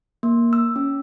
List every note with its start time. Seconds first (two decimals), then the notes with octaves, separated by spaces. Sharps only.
0.23 A#3
0.53 E6
0.76 C#4